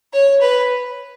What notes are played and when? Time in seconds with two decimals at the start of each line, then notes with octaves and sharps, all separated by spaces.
0.13 C#5
0.41 B4